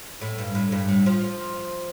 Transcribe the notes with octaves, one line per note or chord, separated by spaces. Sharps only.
A2
G2
A2
G2
A2
F3